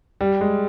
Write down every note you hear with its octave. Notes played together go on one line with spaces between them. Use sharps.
G3
G#3